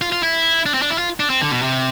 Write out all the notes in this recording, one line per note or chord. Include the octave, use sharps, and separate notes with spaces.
F4
F4
E4
D4
C4
D4
E4
F4
D4
C4
D3
B2
C3